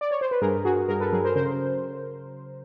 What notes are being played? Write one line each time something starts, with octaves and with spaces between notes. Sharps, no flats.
D5
C#5
C5
B4
G2 G#4 A#4
G2 F#4 G#4
G2 G#4 A#4
A4 B4
F#3 G#4 A#4
A#4 C5
C#3 A#4 C5